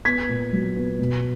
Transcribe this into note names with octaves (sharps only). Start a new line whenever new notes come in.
B3 G#6 B6
A#2
F#3
B3
B2